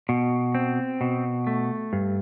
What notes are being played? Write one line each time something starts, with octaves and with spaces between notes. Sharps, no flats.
B2
C4
B2
A3
G2